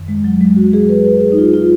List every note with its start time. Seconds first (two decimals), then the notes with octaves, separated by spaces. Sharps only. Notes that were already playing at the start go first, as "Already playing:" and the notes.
Already playing: F#2 D#3
0.08 G#3
0.24 F#3
0.41 G#3
0.56 F#4
0.73 G#4
0.89 B4
1.05 B4
1.21 G#4
1.32 D#4
1.38 F4
1.54 F4